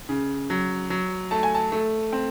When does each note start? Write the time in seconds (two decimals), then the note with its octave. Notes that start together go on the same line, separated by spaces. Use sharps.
0.09 C#3
0.50 F#3
0.90 F#3
1.31 A3 A5
1.43 G#5
1.54 A5
1.72 A3
2.13 C4